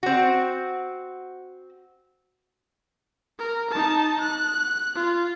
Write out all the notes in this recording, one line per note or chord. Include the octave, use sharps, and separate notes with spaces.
C4 F#4
A#4
D#4 A5
F#6
F4